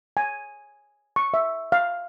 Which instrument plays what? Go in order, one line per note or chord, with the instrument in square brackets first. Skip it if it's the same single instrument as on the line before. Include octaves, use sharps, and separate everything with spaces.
[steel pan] G#5
C#6
E5
F5